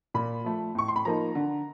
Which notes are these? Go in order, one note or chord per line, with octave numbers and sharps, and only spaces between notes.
A#2 B5
F3 A3
A2 C#6
C6
B5
F3 A#3 D#4 A#5
D3